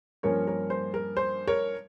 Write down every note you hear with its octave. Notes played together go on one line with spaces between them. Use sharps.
G2 F3 A#3 C#4 A#4 C#5
A#4 C#5
C5
A#4
C5
A#4 C#5